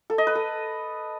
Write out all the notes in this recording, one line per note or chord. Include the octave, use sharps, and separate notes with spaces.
A4
D#5
B4
A4